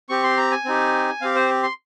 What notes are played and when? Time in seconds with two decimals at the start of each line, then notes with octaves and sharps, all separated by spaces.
0.09 C4 G4 C#6
0.23 C6
0.37 A#5
0.51 G#5
0.65 C4 D#4 G4
1.21 C4 G4 F5
1.35 C5
1.63 C6